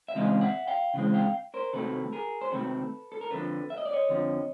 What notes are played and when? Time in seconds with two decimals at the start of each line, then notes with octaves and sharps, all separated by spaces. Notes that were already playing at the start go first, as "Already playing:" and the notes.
0.08 E5
0.15 C#3 E3 G#3 C4 D#5 F5
0.41 E5 F#5
0.67 F5 G5
0.94 C#3 E3 G#3 C4
1.14 F5 G5
1.54 A#4 C5
1.73 C3 D#3 F#3 A3 C4 A4 B4
2.13 G#4 A#4
2.41 C5
2.51 C3 D#3 F#3 A3 C4 A4 B4
3.12 A4
3.21 A#4
3.31 F2 D3 F3 A4 B4
3.70 E5
3.78 D#5
3.85 D5
3.92 C#5 D#5
4.09 F2 D3 F3